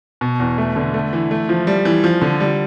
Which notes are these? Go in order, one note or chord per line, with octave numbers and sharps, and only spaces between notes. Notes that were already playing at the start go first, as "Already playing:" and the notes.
B2
E2
A3
D3
A3
E3
A3
F3
G3
E3
F3
D3
G3